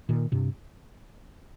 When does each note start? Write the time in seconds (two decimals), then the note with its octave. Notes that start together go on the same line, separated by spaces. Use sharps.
0.09 A#2 D#3
0.32 G2 C3